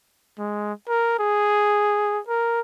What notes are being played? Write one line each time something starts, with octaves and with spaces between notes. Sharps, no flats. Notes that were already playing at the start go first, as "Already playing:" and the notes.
G#3
A#4
G#4
A#4